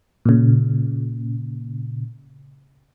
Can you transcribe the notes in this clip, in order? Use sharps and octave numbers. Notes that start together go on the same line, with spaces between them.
A#2 C#3